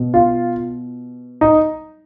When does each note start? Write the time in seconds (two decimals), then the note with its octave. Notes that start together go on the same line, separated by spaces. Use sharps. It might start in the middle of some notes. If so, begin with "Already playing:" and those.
Already playing: B2
0.14 F4
1.41 D#4